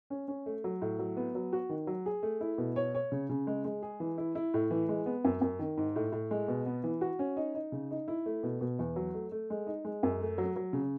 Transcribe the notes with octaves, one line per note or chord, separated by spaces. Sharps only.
C#4
C#4
A3
F#3
A2
F#3
B3
F#3
F#4
D#3
F#3
G#4
A3
E4
B2
C#5
C#5
C#3
C#3
G#3
G#3
G#4
E3
E4
E4
A2
E3
G#3
B3
F#2
F#2
D#3
G#2
A2
A2
G#3
B2
B3
E3
F#4
C#4
D#4
D#4
C#3
D#4
E4
A3
B2
B2
E2
F#3
A3
A3
G#3
D#4
G#3
F#2
A3
F#3
F#3
C#3